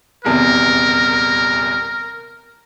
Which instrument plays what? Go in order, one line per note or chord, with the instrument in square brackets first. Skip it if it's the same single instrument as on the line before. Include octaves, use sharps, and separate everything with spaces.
[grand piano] D#1 E2 C3 [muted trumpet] A#4